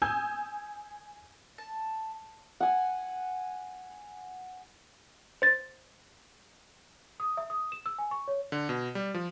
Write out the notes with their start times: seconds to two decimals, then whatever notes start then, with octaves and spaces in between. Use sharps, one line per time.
0.02 G#5 D#6 E6 G6 G#6
1.58 A5
2.60 F#5 G#5
5.42 C5 A6
7.20 D#6
7.37 E5
7.50 D#6
7.72 E7
7.86 E6
7.98 G#5
8.11 C#6
8.28 C#5
8.52 D3
8.69 B2
8.95 G3
9.14 F3